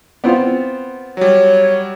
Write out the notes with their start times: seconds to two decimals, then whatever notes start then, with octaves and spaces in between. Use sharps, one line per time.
0.24 B3 C4 F4
1.17 F#3 G3 C#5